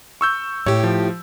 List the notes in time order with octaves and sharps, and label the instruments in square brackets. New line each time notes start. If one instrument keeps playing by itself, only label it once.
[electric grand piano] C#6 E6 G6
[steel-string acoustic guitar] A2 G4 [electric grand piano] C#5
[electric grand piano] F3